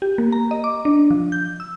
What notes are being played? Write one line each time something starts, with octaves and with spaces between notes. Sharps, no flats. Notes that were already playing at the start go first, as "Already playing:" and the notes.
G4
A#3
A#5
D#5
D6
D4
F3
G6
E6